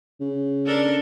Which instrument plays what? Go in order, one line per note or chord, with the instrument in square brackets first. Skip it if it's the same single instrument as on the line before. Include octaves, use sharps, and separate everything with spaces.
[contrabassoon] C#3
[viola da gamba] D4 A4 A#4